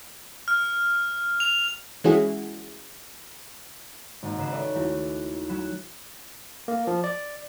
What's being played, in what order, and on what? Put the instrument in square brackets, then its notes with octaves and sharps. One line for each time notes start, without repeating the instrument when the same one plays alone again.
[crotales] F6
F7
[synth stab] E3 G#3 C#4 E4 F#4 G#4
[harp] G#1 A#3
G#2 C#3 B4 C7 E7
A4 B4 C#5 D5 E5
D#2 A3 E4 F#4 A#6
F#3 B5 F#6 E7
[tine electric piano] A#3
F3
D5